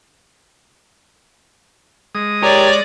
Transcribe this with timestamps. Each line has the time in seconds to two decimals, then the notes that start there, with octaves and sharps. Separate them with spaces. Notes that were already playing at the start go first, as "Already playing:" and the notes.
2.15 G#3 D#6
2.42 G4 A#4 C#5 D5